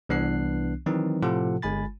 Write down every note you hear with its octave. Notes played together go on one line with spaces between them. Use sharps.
C2 E3 B3 D4 F#6 C7
D#3 E3 F#3 C4 D#4
A2 C3 F3 F4 A4 F#5
G1 G#3 G#5 B5 A6